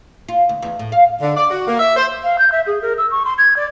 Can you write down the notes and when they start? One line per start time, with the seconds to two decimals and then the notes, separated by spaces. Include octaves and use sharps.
0.28 F4
0.49 D2
0.62 E2
0.79 A2
0.92 F5
1.22 D3
1.37 D5
1.50 F#4
1.68 A#3
1.79 E5
1.96 C5
2.23 F5
2.38 G6
2.52 E5
2.66 G#4
2.82 A#4
2.98 E6
3.11 C#6
3.25 C6
3.38 G#6
3.56 D5